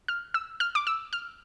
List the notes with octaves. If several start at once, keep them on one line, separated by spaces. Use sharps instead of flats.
F6
E6
F6
D6
E6
F6